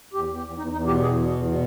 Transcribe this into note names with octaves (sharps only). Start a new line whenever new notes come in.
E2 G4
E2
G4
E2
E2 D#4
E2 D#4
B2 G4
E2 G#4
B2
E2
B2